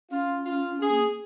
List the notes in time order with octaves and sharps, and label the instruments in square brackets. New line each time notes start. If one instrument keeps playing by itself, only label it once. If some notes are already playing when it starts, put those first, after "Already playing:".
[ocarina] C#4 [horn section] F4
[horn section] F4
[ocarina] C#4 [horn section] G#4
[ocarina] A#3